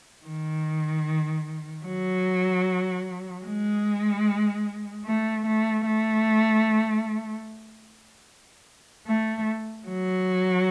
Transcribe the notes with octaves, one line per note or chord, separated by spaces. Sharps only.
D#3
F#3
G#3
A3
A3
A3
A3
F#3